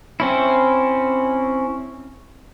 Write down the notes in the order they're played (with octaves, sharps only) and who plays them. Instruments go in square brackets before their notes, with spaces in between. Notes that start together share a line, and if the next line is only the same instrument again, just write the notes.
[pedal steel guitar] C4 C#4 E4